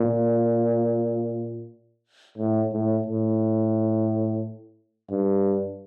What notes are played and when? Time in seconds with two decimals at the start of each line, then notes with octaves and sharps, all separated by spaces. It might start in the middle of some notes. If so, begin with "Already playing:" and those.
Already playing: A#2
2.38 A2
2.73 A2
3.06 A2
5.10 G2